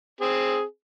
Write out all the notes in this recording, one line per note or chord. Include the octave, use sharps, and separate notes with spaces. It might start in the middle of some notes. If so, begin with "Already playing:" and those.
C4 G#4